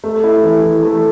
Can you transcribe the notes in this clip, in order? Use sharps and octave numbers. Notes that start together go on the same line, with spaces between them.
A3
E4
E3
E3
A3